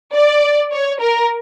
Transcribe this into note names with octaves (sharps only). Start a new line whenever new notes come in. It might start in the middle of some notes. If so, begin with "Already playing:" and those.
D5
C#5
A#4